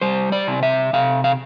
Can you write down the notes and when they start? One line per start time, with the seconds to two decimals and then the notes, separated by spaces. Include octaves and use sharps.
0.01 G3 C5
0.32 D5
0.48 C3
0.63 E5
0.93 C3 F5
1.24 F5